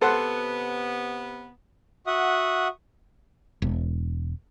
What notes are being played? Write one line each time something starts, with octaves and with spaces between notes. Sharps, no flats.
C3 B3 A4 C5 F#5
F#4 E5 F#5 D#6
E1